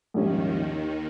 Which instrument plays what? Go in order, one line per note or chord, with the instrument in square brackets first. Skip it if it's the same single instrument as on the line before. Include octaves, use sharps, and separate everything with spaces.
[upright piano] A#1 G#2 G3 C#4 [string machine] D#2 D#3